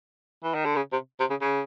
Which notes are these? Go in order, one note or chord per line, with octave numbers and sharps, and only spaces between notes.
E3
D#3
D3
C#3
C3
C3
C#3
C#3